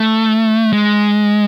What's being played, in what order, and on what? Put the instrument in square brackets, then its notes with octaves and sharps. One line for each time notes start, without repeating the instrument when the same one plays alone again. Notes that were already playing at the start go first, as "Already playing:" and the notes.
Already playing: [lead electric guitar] A3
G#3